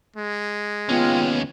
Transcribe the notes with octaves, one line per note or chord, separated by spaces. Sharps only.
G#3
D#2 B3 C#4 F4 G5